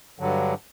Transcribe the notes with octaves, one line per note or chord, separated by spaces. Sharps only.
G2 D3 F#3